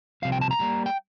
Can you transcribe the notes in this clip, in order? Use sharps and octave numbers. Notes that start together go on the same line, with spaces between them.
C2 C3 F3 F5
G5
A5
A#5
A2 G3 A#3
G5